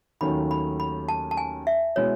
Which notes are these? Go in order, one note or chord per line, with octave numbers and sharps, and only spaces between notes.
D#2 D#3 F#3 A3 C#4 B5
B5
B5
A5
A5
G#5
E5
B2 G#3 B3 E4 C#5